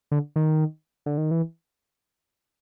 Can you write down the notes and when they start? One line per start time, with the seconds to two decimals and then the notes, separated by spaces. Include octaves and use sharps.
0.11 D3
0.36 D#3
1.06 D3
1.18 D#3
1.31 E3